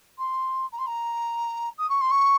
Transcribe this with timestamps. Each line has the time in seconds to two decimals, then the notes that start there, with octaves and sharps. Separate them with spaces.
0.18 C6
0.72 A#5
0.78 C6
0.86 A#5
1.78 D#6
1.89 C#6
2.01 C6
2.11 C#6